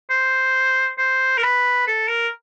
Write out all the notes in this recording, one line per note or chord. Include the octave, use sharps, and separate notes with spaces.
C5
C5
A#4
B4
A4
A#4